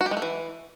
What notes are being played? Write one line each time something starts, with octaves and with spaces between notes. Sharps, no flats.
F#4
G4
G#3
A3
E3